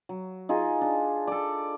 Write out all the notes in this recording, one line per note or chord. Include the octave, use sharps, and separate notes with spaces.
F#3
D#4 F4 G#4 D#5
D4
A4 D5